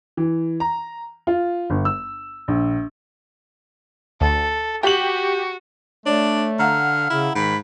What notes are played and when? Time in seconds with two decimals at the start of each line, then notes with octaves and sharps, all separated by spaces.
0.17 E3
0.60 A#5
1.27 F4
1.70 G1
1.85 E6
2.48 A#1
4.21 D2 A4
4.83 F#4 G4 F#7
6.06 A3 D4 C#5 D5
6.59 D3 F5 F#5 A#5 F6
7.10 C#3 E4
7.35 G#2 D#3 B5